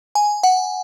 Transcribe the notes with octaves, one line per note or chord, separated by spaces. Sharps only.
G#5
F#5